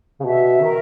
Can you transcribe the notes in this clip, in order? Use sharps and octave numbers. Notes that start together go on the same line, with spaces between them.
C#3
B2 E5
D#3 A#4